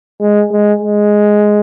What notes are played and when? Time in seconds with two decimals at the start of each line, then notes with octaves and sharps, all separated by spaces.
0.20 G#3
0.51 G#3
0.82 G#3